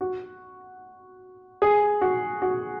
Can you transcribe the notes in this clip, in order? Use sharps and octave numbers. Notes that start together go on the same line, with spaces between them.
F#4
G#4
F#4
F#4